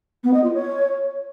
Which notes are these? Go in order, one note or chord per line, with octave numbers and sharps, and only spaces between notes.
B3
D#5
F4
C#5